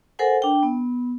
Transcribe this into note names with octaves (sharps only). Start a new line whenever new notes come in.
A4 A#4 C5 F#5 G#5
D4 G5
B3